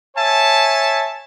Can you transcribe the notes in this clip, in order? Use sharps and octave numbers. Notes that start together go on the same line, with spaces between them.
C#5 E5 G#5 A5